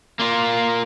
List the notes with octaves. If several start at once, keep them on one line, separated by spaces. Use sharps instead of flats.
A#3 F4